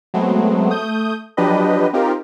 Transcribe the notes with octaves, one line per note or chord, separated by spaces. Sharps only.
F#3 G#3 A3 B3 C4
A3 D#6 G6
F3 F#3 D4 G4 B4 D#5
C4 D#4 F4 G4 A#4